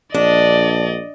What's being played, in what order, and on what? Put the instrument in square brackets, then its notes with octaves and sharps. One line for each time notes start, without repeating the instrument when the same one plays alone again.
[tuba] A#1 [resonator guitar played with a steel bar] D4 [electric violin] D5 D#5